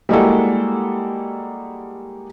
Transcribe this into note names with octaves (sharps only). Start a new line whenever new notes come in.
G3 G#3 A#3 E4 F#4 A4